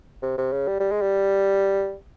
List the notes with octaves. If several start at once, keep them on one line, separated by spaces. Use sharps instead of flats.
C3
C3
C#3
G3
G3
G#3
G3